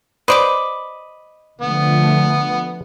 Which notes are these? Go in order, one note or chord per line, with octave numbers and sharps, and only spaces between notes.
B4 C5 D5 D#5 B5 D6
D3 F3 A3 B3